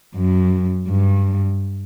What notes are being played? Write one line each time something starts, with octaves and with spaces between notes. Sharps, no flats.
F#2
G2